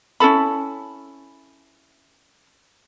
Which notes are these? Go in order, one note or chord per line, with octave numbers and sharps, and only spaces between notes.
C#4 E4 A4 B5